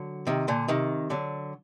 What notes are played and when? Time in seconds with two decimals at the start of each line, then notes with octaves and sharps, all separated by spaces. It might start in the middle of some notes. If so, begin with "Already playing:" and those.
Already playing: D3 F#3
0.27 C3 D#3
0.48 A#2 D3
0.68 C3 D#3
1.10 D3 F#3